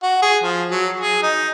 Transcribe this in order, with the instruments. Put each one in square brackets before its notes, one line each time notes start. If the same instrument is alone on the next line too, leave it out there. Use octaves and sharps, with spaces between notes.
[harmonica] F#4
G#4
F3
F#3
G#4
D#4